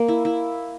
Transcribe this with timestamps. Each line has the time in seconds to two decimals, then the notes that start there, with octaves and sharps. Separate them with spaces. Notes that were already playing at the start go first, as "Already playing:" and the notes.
Already playing: A#3
0.08 E4
0.25 E4